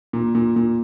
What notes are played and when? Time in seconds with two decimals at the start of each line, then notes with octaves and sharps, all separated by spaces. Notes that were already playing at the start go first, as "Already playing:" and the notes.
0.13 A#2
0.35 A#2
0.56 A#2